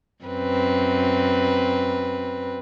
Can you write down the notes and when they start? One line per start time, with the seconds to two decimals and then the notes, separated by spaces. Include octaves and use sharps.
0.25 F#2 C4 B4